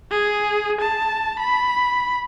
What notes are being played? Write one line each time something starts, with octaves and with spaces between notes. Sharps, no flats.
G#4
A5
B5